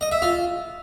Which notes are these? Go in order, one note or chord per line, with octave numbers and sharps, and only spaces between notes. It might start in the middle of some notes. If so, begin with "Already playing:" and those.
D#5
E5
F4